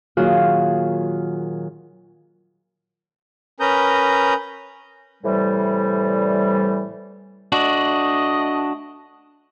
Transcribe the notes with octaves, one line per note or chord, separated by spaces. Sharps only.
A#2 D#3 F#3 F4 F#4 G#4
C#4 A#4 B4 A#5 D#6 G6
A2 C3 E3 G3
A3 D4 F#4 D#5